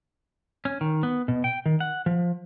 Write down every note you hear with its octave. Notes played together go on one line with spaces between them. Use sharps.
C#4
D#3
B3
B2
G5
D#3
F#5
F3